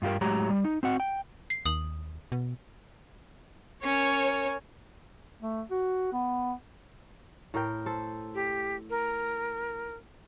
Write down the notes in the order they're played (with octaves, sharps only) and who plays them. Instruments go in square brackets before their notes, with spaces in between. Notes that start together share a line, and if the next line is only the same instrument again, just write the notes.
[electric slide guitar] G2 F4 G4 A#4
A2 F#3 G#3 G4 C#5 A#5
G3
D#4
C4 F#4 F#5
G5
[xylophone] C7
[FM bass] D#2 [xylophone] D#6 F#7
[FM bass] B2
[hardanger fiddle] C#4 [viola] A#4 C#5
[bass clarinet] A3
F#4
B3
[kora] A2 A#4 G5
A4 C5
[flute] G4
A#4